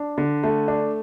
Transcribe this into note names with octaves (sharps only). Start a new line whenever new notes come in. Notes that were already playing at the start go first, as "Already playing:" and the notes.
Already playing: D4
D3
A3
D4